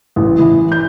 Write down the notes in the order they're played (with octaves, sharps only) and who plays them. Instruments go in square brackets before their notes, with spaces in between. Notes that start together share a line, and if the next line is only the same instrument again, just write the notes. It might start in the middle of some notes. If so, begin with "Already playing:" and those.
[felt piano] A1
E3
G6